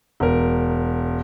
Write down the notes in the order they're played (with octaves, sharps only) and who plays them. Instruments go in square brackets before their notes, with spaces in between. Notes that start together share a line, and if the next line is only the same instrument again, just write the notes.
[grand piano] E1 A#4